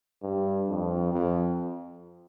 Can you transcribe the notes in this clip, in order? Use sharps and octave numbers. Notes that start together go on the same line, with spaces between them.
G2
F2
F2